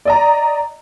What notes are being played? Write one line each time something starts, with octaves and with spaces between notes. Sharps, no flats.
D5 D#5 A#5